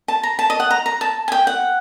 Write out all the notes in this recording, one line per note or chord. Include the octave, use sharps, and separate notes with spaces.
A5
A#5
A5
D#5
F#5
A#5
A#5
A5
G#5
G5
F#5